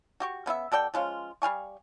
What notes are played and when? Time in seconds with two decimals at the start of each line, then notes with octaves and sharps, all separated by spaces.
0.20 F#4 G4 C#6
0.46 C#3 B3 E4 E5
0.72 B2 A4 D5 G5
0.94 F3 G#3 C#4 F4
1.42 G3 F5 G#5 C#6